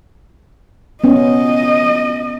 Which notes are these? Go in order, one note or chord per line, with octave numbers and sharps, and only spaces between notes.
B3 C#4 D#5